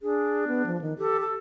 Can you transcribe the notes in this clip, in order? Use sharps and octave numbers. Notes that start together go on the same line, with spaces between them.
D4 G#4
B3
F3
D#3
G4 A4
A4